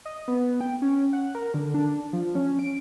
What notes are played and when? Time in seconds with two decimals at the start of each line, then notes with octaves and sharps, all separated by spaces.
0.05 D#5
0.28 B3
0.61 G5
0.82 C#4
1.13 F#5
1.35 A#4
1.54 D3
1.74 D4
2.13 F3
2.35 C#4
2.59 D7